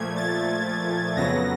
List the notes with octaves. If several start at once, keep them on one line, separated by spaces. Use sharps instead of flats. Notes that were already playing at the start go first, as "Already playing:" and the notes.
Already playing: A#2 F3 A3 G#6
A6
F2 C#3 F#3 B3 A#6